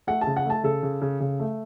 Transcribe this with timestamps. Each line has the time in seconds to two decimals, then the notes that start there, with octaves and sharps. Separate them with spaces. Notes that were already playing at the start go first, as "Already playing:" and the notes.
0.07 A3 F#5
0.21 A5
0.27 C#3
0.37 F#5
0.45 A3 A5
0.63 C#3 A4
0.83 C#3
1.01 C#3
1.20 C#3
1.40 A3